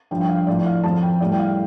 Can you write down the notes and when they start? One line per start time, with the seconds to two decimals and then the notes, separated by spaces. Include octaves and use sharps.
0.11 G2 F3 G5
0.21 G5
0.29 F5
0.47 A2 F3 D5
0.66 F5
0.83 F2 F3 A5
1.03 G5
1.20 A2 G3 D5
1.32 G5
1.39 F5